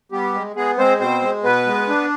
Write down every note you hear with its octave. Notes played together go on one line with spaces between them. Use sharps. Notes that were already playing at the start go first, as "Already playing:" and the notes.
G3 B3 G4
G#3
G#3 B3 G#4
G#3 C4 C5
B2 C4 C5
G#3
B2 B3 B4
G#3
D4